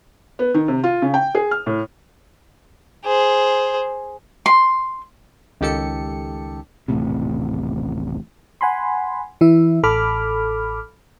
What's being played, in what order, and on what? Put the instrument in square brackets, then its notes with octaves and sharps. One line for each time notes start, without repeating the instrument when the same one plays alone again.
[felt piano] B3
D#3
C3
F4
C#3
G5
G#4
F6
A2
[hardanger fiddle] G#4 C5
[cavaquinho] C6
[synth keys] C#2 D#3 G4 A4 C#7
[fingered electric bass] D#1 A1 A2 C3
[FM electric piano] F#5 G#5 B5 C6
E3 E4 E5
A1 A4 B5 D6 F6